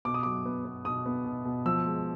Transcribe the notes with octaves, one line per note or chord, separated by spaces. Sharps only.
B2 D6
D#6
F#3 D6
B3
B3
B2 D#6
B3
B2
B2
F3 E6
G#3